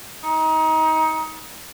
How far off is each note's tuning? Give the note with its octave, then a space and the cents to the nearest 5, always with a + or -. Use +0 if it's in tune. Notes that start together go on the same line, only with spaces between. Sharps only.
D#4 +25